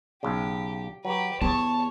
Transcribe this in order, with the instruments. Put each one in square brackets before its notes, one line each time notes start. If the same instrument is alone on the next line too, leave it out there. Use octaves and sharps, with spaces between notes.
[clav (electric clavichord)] B1 C#3 [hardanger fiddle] G4
[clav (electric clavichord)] F#3 [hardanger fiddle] G4 B4
[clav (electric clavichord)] E2 [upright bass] B3 [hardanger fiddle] C#5 [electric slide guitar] A5